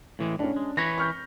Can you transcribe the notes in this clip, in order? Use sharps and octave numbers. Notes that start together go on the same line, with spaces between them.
A2 E3 G#3
A2 C#4 D4
G#3
E3 B4 C#5 A#6
C#6 F6 G6